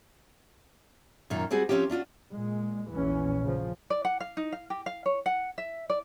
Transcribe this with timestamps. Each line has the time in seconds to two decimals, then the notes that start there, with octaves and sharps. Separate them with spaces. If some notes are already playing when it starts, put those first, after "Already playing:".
1.30 F#2 A#2 D#3
1.51 G3 C4 F#4 G#4
1.69 F3 G3 C4 C#4 F4 G4
1.90 C#4 D4 F4 F#4
2.33 A#2 G#3
2.94 A#1 E2 E3 C#4
3.42 C#3 F3
3.90 D5
4.05 F#5
4.20 F5
4.37 D#4
4.52 F5
4.70 G4
4.86 F5
5.06 C#5
5.26 F#5
5.58 E5
5.90 D5